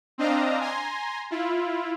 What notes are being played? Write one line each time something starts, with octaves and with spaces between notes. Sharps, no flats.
C4 D4 D#5 F5 A#5
G#5 A#5 C6
E4 F4